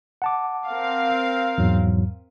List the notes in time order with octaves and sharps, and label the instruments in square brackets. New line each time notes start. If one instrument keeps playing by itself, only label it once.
[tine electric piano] F#5 A5 D6
[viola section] C4 A#4 F5
[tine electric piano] E2 G#2 F#3